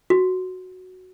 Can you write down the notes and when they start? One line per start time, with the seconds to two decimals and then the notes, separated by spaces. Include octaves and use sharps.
0.10 F#4